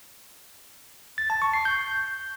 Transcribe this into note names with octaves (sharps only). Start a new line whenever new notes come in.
A6
A5
C#6
C7
G6